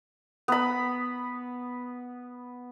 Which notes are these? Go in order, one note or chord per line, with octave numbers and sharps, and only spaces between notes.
B3 B5